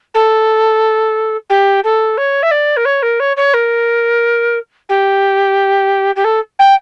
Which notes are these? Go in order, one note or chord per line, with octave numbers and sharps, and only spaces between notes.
A4
G4
A4
C#5
E5
D5
A#4
C#5
A#4
C#5
C#5
A#4
G4
G4
A4
G5